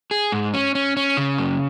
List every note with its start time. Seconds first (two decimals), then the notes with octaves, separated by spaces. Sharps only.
0.11 G#4
0.32 G#2
0.54 C#4
0.75 C#4
0.97 C#4
1.17 C#3
1.38 F#2